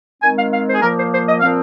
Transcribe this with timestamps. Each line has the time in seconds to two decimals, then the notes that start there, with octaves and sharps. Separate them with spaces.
0.21 D#3 G#3 C4 G#5
0.36 F5
0.51 F5
0.67 C5
0.74 G#4
0.81 A#2 F3 A#3 A#4
0.96 C5
1.11 C5
1.25 D#5
1.40 A#2 F3 C4 F5